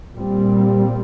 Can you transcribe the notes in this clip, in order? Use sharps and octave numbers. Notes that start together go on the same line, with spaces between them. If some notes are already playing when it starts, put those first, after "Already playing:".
A#2 G3 C4